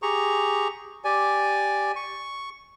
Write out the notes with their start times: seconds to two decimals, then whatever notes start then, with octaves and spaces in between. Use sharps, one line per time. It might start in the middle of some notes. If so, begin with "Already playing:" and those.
0.02 G4 G#4 A#5 C#6
1.05 G4 D5 G#5
1.96 C#6